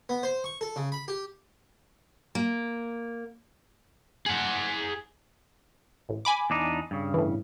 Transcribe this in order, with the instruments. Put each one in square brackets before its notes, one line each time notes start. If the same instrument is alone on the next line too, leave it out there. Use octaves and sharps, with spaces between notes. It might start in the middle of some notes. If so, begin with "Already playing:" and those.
[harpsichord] B3
C5
C#6
A4
C#3
B5
G4
[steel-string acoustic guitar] A#3
[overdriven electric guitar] G#4 F#5
[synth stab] A1
G#5 B5 D6
[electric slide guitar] E2 D4 D#4
G2 C#3
[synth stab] A2 E3